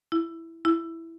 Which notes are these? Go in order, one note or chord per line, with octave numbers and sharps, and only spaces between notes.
E4
E4